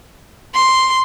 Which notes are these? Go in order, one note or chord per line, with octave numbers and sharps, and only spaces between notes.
C6